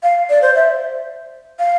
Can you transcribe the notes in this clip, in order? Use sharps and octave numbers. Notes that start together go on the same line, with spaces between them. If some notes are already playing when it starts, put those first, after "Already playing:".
F5
D5
C5
E5
F5